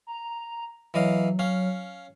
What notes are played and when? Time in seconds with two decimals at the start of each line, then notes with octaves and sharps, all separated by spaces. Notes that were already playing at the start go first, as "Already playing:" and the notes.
0.07 A#5
0.94 E3 F#3 D#5 F5
1.39 C#4 F5